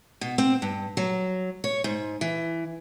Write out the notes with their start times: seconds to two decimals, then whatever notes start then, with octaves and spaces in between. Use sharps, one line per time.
0.21 B2
0.38 C4
0.62 G2
0.97 F#3
1.64 C#5
1.84 G#2
2.21 E3